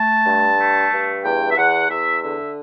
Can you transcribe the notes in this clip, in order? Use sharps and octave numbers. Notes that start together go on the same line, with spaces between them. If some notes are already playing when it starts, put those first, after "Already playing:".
Already playing: A3 A5
G2
A3
G2
E2 G5
E5
E2 F#5
E2 E5
D3 E5